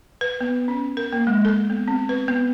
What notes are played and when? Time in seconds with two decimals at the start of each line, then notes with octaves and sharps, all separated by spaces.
0.21 B4
0.41 B3
0.68 C#4
0.97 A#4
1.13 A#3
1.27 G#3
1.45 A4
1.70 B3
1.88 C4
2.09 B4
2.28 B3